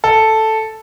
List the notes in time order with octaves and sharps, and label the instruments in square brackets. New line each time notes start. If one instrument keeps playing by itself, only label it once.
[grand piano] A4